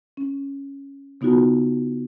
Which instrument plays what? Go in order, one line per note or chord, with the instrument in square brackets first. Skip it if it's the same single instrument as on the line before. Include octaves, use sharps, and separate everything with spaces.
[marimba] C#4
C#3 B3 D#4 F4 F#4